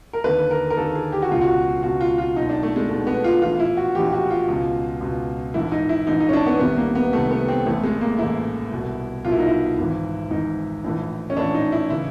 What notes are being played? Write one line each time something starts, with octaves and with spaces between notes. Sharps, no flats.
A#4
D#2 D3 B4
A#4
A#4
D#2 D3 A4
G#4
G4
F#4
C#2 B2 F4
F#4
C#2 B2 F#4
F4
F4
B1 B2 D#4
D4
A3
G#3
B1 B2 A3
B3
F4
A#1 A2 E3 F4
E4
F#4
A#1 A2 E3 G4
F#4
F4
C#2 B2
C#2 B2
A#1 G#2 E3 E4
D#4
E4
A#1 G#2 E3 D#4
D#4
C#4
D4
B3
C2 C3 D#3 B3
A#3
B3
C2 C3 D#3 A3
B3
C4
A1 A2 E3 A3
G#3
A#3
A1 A2 E3 E4
C2 B2
C2 B2 F4
E4
D#4
E4
G#1 G#2 E3
G#1 G#2 E3 D#4
A#1 A2 E3
C#4
A#1 A2 E3 D4
D#4
E4
C#3 E3 E4